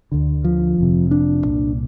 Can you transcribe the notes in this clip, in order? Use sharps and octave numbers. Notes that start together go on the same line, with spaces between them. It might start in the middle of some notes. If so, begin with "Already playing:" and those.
D2 D3
F3
F1 F2 C3
D4
C2 A#2